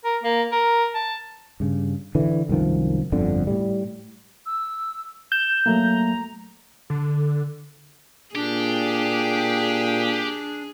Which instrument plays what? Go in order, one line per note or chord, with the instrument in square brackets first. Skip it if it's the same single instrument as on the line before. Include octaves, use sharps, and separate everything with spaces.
[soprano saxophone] A#4
A#3
A#4
A5
[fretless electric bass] G2 C#3
D3 E3
C2 F#2 D#3 F3
G1 F2 D3
A2 G3
[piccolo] E6
[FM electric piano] G6 [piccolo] E7
[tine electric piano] F#3 A3 A#3 [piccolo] A#5
[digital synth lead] D3
[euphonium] A#2 [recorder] D4 [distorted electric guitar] G4 [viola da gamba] G#4